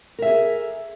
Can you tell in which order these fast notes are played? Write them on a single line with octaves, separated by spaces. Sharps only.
A#4 E5 G#4